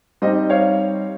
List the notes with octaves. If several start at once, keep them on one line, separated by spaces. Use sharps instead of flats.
G3 C4 D#4 C5 D#5
C#5 F5